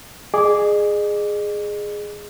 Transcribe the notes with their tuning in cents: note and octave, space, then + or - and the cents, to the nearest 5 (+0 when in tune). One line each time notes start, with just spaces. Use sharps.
G#4 +0 D#5 -40 D6 -10